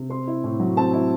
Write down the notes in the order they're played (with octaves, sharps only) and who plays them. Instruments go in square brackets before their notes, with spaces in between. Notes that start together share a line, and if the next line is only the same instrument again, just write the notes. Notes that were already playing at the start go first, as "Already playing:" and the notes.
Already playing: [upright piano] C3
C4 C6
E4
A2
F#3
C4 A5
E4